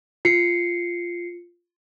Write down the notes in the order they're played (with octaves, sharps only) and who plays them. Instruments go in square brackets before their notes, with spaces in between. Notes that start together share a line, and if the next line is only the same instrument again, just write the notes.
[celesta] F4 C7 C#7